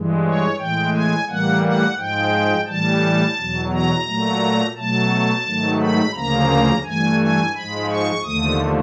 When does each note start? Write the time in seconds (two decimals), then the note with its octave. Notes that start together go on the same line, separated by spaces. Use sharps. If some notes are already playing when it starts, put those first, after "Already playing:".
Already playing: G2 E3 G#3
0.24 C#5
0.58 A2 E3 G#3 G5
0.93 G#5
1.28 A2 E3 G3 A#3 F#5
1.63 F#5
1.98 G#2 F3 G#3 G5
2.67 A2 E3 G3 A5
3.37 E2 B2 F#3
3.72 A#5
4.06 A#2 F#3 A3
4.76 B2 F#3 A3 A5
5.46 G#2 D#3 F#3 A3
5.80 B5
6.15 D2 C#3 F3 A#3 A#5
6.85 G2 E3 A3 G#5
7.20 G#5
7.54 G#2 F3 G#3 B5
7.90 C#6
8.24 D#2 D3 F3 A3 D#6